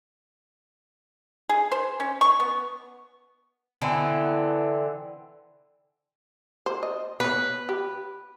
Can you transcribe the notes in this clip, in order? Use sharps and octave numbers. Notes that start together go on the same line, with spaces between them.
G#4
C5
C#4
C#6
B3
D3 E3 B3 C4
C5
D#5
B3 B4 C#5
G4